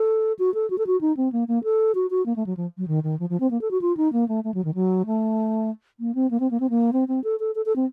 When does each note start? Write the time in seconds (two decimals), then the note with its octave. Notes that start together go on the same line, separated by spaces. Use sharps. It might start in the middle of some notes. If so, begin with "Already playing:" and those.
Already playing: A4
0.39 F#4
0.54 A4
0.70 F#4
0.78 A4
0.87 F#4
1.01 D#4
1.17 C4
1.32 A#3
1.48 A#3
1.64 A4
1.95 F#4
2.10 F#4
2.26 A#3
2.36 A3
2.46 F#3
2.57 F3
2.78 F#3
2.88 D#3
3.03 D#3
3.19 F3
3.30 F3
3.40 C4
3.51 A#3
3.61 A4
3.71 F#4
3.81 F4
3.97 D#4
4.13 A#3
4.28 A3
4.44 A3
4.54 F#3
4.65 D#3
4.74 F#3
5.06 A3
6.00 A#3
6.15 C4
6.31 A#3
6.40 C4
6.51 A#3
6.60 C4
6.70 A#3
6.93 C4
7.08 C4
7.24 A4
7.40 A4
7.55 A4
7.66 A4
7.76 C4